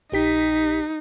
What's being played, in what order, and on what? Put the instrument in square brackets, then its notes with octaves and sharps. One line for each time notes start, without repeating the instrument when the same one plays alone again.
[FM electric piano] A#1 G4 B6 [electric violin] D#4